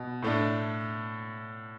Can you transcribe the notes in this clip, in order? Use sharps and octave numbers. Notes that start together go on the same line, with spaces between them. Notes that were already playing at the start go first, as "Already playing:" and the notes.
Already playing: B2
A2 A3 D4